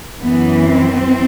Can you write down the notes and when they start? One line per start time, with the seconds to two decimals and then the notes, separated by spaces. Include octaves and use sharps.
0.22 F#2 E3 B3
0.68 C4